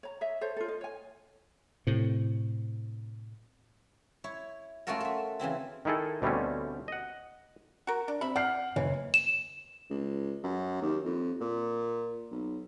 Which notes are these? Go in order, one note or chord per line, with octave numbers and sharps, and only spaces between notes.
C#5 A#5
C#5 D#5 E5
A4 C5 C#5
F4 A4
D#5
C#5 G#5
A2 C3
E4 C#5
A3 C#4 F4 F#4 A4 A#4
A4 E5
C#3 E3 C4 E4
D#3 D#4 E4 G#4 A4
D2 B2 G3 A3 C4 C#4
D#5 F#5
F#4 A#4
D4
C4 E5 B5
D5 F#5 F6 C7
F#1 E3 C#5
E7
C#2
F#2
D#2
F2
A#2
B1